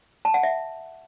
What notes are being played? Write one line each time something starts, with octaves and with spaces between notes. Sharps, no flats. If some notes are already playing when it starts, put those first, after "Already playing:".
A5
F#5
E5